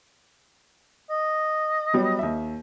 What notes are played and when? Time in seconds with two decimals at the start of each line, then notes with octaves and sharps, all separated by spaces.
1.10 D#5
1.94 F#3 G3 B3
2.19 D#2 E5